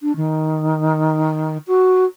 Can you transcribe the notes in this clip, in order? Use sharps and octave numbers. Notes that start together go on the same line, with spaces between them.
D4
D#3
F#4